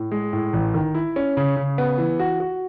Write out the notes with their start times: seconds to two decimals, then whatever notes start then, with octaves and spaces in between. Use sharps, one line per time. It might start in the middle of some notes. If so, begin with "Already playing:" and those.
Already playing: A2
0.11 G#3
0.33 A2
0.53 A1
0.74 D#3
0.95 E4
1.16 C#4
1.37 C#3
1.56 C#3
1.78 B3
1.98 E3
2.20 F#4
2.40 F#4